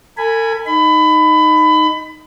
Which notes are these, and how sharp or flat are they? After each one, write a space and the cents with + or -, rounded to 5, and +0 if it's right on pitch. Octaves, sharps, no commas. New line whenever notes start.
A4 +45 G#5 +0 B5 +0
D#4 +0 B5 +25